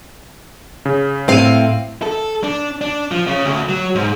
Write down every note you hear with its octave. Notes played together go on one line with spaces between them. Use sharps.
C#3
A2 C4 F5 D#7
A4
D4
D4
F3
C#3
D2
F#3
G#2